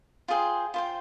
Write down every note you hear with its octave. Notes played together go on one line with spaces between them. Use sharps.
F4 G#4 C5 G5
F4 C5 G5